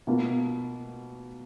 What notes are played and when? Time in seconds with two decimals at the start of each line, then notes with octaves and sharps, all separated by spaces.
0.07 B2 A#3 F4